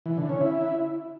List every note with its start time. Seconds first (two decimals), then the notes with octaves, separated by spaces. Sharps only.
0.06 E3
0.17 D3
0.29 C#4
0.41 E4